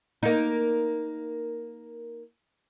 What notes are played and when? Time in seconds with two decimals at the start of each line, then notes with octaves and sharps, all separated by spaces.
0.23 A#3 D#4